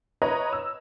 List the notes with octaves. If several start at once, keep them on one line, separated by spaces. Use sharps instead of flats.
B4 C#5 D#5 A#5
E6